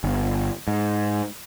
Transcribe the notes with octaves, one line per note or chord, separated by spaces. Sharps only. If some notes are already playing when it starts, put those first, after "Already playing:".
G1
G#2